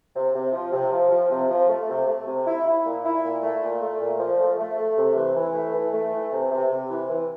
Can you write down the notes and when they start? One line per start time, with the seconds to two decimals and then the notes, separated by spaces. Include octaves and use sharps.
0.15 C3
0.34 C3
0.53 F3
0.72 C3
0.91 F3
1.11 F3
1.30 C3
1.50 F3
1.69 A3
1.89 C3
2.08 A3
2.27 C3
2.47 E4
2.66 E4
2.85 A#2
3.05 E4
3.24 A#2
3.42 A3
3.63 A#2
3.82 A3
4.00 A#2
4.19 F3
4.40 A3
4.58 A3
4.78 A3
4.97 C3
5.16 E3
5.35 E3
5.55 A3
5.74 E3
5.94 A3
6.12 E3
6.33 C3
6.51 C3
6.71 C3
6.90 E3
7.09 E3